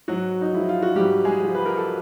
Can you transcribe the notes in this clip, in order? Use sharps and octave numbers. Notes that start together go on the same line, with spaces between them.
G#2 F#3 F#4
D#4
F3 G#3 E4
F4
F#4
G#2 G3 G4
G#3 G#4
F3 G#3
B4
A#4
A4